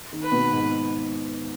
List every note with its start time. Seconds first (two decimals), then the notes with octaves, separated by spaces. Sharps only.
0.13 D#3
0.23 B4
0.32 B2
0.52 G#2